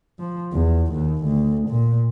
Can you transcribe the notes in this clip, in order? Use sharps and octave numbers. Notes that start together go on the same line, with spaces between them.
F3
E2
D#2
D2
A#2